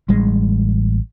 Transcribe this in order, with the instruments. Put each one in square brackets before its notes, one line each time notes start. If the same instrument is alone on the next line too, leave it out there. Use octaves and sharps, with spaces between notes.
[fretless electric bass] A1 G3 G#3